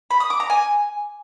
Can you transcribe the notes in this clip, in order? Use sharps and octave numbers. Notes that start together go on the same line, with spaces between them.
B5
D#6
D6
A#5
G#5